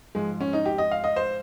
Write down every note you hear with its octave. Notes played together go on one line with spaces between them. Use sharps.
G#2 F3 G#3
C#4
D#4
G4
D#5
F5
D#5
C5